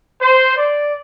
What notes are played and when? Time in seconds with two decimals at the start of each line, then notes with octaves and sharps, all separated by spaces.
0.22 C5
0.57 D5